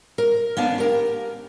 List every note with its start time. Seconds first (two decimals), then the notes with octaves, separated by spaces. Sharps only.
0.18 A#4
0.57 A#3 B3 C#4 D4
0.78 G4 A#4